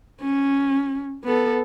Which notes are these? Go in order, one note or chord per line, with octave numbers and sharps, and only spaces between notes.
C#4
B3 A4